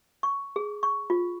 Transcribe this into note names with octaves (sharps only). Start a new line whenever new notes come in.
C#6
G#4
C#6
F4